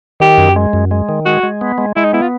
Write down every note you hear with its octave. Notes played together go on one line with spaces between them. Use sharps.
D#3 G4
F#2
G#3
F#2
G#3
D#3
G#3 F#4
G#3
B3
G#3
G#3 E4
D#4
B3 E4
F4